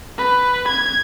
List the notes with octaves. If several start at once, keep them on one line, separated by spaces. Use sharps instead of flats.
B4
G#6